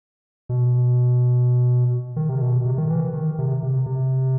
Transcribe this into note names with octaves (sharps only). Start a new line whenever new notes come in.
B2
D#3
C3
B2
C3
D#3
E3
D#3
C3
C3
C3